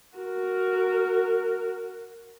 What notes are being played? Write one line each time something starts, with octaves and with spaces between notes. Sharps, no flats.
F#4 A#4